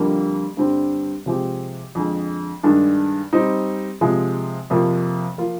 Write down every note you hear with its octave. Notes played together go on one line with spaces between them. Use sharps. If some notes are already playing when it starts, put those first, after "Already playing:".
Already playing: F2 D3 G3 A#3
G2 D3 G3 C4
C3 F3 G#3 C4 G4
F2 D3 G#3
G2 D#3 G#3 D4
G3 C4 D#4
C3 F3 G#3
F2 C3 F3 A#3
F3 A#3 F4